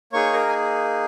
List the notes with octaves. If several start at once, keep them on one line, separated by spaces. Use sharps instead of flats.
A#3 D#4 G#4 C#5 C#6
A#4 A#5
G#5